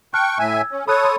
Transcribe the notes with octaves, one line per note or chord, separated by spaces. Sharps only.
G5 A5 C#6 F6 F#6
A2 E5 G#5
E6 G#6
C#4
A4 C#5 B5 D#6 F#6
B5 C6